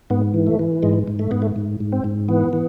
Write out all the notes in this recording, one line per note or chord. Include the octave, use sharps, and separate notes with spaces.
G#2 B3
E3
A3
E3
G#2 G#3
G#2
A3
G#2 B3
A3
G#2
G#2
C4
G#2
E3 B3
E3